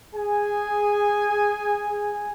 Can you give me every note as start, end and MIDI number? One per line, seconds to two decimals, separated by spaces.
0.14 2.32 68
0.14 2.32 80